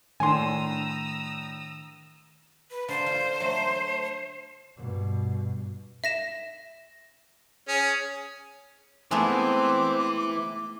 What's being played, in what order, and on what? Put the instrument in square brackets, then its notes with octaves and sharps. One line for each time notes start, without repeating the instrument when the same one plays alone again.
[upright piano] A2 D4 [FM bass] D#3 [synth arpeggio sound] G#5 C6 [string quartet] A#5 D#6 E6
[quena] B4
[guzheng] D3 A#3 [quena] C5
[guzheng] F4
F#3 A3
[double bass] G2 B2
[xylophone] E5 A#6 E7
[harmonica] C#4 G#4
[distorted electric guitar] E3 [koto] G#3 A3 B3 [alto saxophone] C4 [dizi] D6